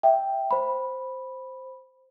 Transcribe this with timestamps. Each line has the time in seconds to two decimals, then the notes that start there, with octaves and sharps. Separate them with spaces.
0.03 E5 G5
0.51 C5 B5